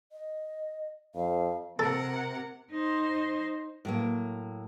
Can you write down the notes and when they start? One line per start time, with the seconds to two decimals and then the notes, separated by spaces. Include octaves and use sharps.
0.12 D#5
1.15 F2 F5
1.79 C3 A4 A#4 F#5
2.71 D#4 C5
3.85 A2 F#3 A#3